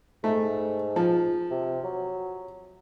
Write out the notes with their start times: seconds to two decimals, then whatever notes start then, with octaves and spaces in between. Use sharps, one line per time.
0.24 G#2 A3
0.96 F3
1.51 C3
1.84 F#3